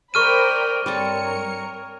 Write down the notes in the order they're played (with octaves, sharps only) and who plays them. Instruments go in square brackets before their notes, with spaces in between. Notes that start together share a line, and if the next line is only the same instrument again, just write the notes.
[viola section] A#4 D5 G5 [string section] C5 B5 [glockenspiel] C#6 F6 D#7
[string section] G2 C#7 [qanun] G3 C4 A4 [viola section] A#4 C#5